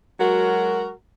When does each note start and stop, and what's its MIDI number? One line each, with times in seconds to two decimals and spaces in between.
0.20 0.91 54
0.20 0.91 56
0.20 0.91 66
0.20 0.91 70